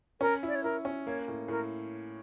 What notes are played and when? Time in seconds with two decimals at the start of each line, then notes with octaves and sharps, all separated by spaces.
0.21 C#4 A#4
0.43 E4 D5
0.55 C#5
0.64 E4 A#4
0.85 C#4
1.06 A#3 C#5
1.28 A2
1.48 A2 A#4